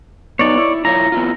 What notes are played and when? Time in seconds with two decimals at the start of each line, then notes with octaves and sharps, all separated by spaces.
0.39 B3 D#4 C#5 D5
0.58 E4
0.85 E4 F4 C#5 A#5
1.12 B3 E4 F4